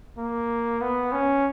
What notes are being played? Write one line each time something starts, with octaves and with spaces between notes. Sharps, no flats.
A#3
B3
C#4